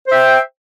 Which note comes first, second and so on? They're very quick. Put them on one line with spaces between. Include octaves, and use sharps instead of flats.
C5 E5 G5